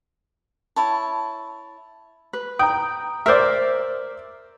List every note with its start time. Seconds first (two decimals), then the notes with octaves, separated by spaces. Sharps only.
0.76 E4 C#5 A5
2.33 B4
2.59 G5 A#5 D#6
3.26 A#4 C5 D5 E5